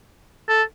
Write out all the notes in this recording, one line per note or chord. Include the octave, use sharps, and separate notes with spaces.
A4